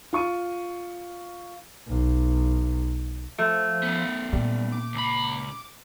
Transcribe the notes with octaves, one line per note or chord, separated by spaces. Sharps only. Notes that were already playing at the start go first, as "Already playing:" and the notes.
F4 C#6 D#7
B1
F3 A3
B3 C#4
A#2 G3
D6
C#2 B5